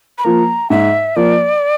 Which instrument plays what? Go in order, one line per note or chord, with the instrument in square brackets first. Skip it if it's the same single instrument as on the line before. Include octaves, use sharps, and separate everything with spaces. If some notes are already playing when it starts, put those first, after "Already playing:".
[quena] B5
[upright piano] F3 A#3 [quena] A#5
[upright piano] G#2 [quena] E5
[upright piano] F3 A#3 [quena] D5